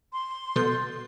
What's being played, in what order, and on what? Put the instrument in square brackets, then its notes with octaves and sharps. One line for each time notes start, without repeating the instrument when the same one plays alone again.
[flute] C6
[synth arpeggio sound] B2 [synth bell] A4 G6